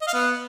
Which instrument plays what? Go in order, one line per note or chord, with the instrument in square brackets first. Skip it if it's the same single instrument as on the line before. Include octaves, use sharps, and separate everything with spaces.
[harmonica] D#5
F5
B3